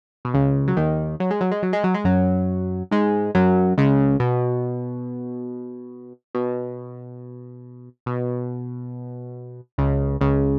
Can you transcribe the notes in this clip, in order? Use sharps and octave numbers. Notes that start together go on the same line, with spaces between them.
B2
C#2 C#3
F#3
D#2 D#3
F#3
G#3
F#3
G#3
F#3
G#3
F#3
G#3
F#2 F#3
G#2 G#3
F#2 F#3
C#2 C#3
B2
B2
B2
C#2 C#3
C#2 C#3